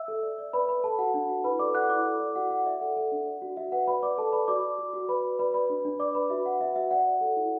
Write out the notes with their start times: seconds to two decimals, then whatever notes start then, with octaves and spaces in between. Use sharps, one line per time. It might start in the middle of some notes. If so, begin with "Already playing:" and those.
Already playing: E5 E6
0.08 A4
0.23 D5
0.38 D5
0.53 B4 D5 B5
0.68 B4 D5 B5
0.84 A4 A5
0.98 F#4 F#5
1.14 D4
1.29 F#4
1.44 E4 B4 B5
1.59 A4 D5 D6
1.75 A4 F#5 F#6
1.90 E4 D5 D6
2.06 A4
2.20 D5
2.35 F#4 F#5
2.51 F#4 F#5
2.66 D5 E5
2.81 A4 F#5
2.97 A4
3.12 D4
3.27 D5
3.42 F#4
3.57 F#4 E5
3.72 B4 F#5
3.87 B4 D5 B5
4.03 D5 D6
4.18 A4 D5 A5
4.33 B4 D5 B5
4.48 F#4 D5 D6
4.63 F#4
4.78 F#4
4.93 F#4
5.09 B4 D5 B5
5.24 D5
5.39 B4 D5 B5
5.54 B4 D5 B5
5.70 D4
5.85 D4
6.00 D5 D6
6.15 B4 B5
6.30 F#4 E5
6.45 F#4 F#5
6.61 F#4 E5
6.76 F#4 E5
6.91 D5 F#5
7.06 D5
7.21 A4
7.37 E4